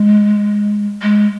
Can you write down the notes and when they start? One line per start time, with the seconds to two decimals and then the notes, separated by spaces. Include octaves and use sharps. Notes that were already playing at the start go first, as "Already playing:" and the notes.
Already playing: G#3
1.02 G#3